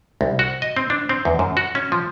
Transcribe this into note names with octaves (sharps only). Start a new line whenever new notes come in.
C2
F#4
D#5
C4
D4
C4
E2
F#2
F#4
C#4
F3